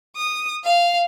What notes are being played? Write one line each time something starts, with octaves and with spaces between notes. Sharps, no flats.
D#6
F5